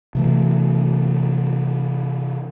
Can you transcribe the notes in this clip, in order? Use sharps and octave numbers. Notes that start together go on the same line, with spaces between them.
C3 E3 A3